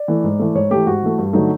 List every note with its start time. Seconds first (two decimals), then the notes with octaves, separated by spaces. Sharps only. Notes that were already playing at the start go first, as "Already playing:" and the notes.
Already playing: D5
0.08 E3 A3
0.24 G#2
0.39 E3 A3
0.55 G#2 C#5
0.71 E3 A3 G4
0.87 G#2 F#4
1.02 E3 A3
1.18 G2
1.33 D3 F#3 A3 D#4